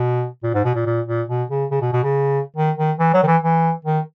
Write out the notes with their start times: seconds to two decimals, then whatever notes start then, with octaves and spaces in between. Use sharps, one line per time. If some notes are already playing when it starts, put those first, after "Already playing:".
Already playing: B2
0.43 A#2
0.54 G#2
0.65 B2
0.75 A#2
0.86 A#2
1.07 A#2
1.29 B2
1.50 C#3
1.71 C#3
1.82 B2
1.93 B2
2.03 C#3
2.57 D#3
2.77 D#3
2.99 E3
3.14 F#3
3.23 D#3
3.27 E3
3.42 E3
3.85 D#3